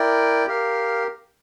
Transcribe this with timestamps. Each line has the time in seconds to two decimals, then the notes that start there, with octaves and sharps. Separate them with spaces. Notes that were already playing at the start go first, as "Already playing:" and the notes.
Already playing: E4 A#4 D5 G5
0.47 G4 A#4 F5